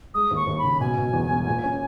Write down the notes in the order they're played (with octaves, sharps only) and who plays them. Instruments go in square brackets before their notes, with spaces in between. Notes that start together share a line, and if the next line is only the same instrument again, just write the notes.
[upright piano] G#3 [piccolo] D#6
[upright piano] D#2
[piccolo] C#6
[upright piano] D#2
[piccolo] B5
[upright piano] C#3
[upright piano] B2 [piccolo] G#5
[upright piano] B2
E2
E1
A#2
C#4